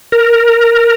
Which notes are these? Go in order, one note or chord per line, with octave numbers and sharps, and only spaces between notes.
A#4